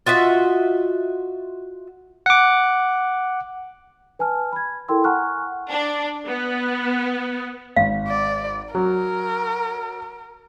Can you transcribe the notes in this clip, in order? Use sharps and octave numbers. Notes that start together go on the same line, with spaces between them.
F4 F#4 D#5 E5
F#5 D6
B4 G#5 A5 F6
B5 G#6
E4 A4 A#4 G5 C6 E6
F#5 G#5 A#5 C#6 F6 F#6
D4
B3
G#1 F5
D5
F#3 A#4